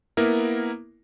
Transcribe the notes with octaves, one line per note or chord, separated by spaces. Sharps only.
A#3 B3 E4 A#4